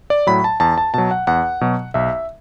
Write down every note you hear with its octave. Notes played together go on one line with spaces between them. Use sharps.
D5
A2 F#3 B5
A5
E2 A5
A5
B2 F#3 A5
F#5
E2 F#5
B2 F#3
B1 E5